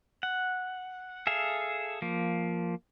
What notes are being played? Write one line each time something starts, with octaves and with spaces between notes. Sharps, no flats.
F#5
G#4 A4 E5 F5
F3 A#3